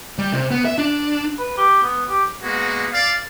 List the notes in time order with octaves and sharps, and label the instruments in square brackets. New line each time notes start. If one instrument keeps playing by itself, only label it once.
[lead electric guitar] G3
C3
B3
E5
D4
[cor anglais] B4
G4
B3
G4
[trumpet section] G#3 A#3 B3 F#4
D5 F5